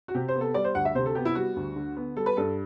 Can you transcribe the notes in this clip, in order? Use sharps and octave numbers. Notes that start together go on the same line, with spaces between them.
F#4
C3 G4
C5
B3
A4
G3 D5
C5
D2 F#5
E5
C3 C5
A4
B3 G4
E4
G3 F#4
D2
D3
B3
G3 A4
B4
G2 A4